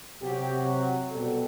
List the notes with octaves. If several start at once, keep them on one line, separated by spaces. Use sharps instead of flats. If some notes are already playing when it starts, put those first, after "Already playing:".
C3 F#3 G4
B2 G3 A4